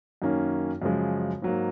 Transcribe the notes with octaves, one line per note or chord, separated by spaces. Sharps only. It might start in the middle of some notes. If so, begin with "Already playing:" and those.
F#2 D#3 A#3 C#4
F#2 C#3 F3 G#3
G#2 F#3 A#3